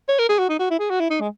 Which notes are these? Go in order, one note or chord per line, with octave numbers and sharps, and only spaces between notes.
C#5
A#4
G#4
F#4
D#4
F#4
E4
G#4
F#4
E4
D#4
G#3